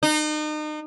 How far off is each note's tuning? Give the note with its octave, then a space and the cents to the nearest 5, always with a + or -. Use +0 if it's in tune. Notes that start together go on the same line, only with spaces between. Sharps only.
D#4 -35